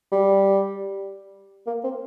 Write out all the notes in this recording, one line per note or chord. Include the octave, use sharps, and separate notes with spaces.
G3
A#3
C4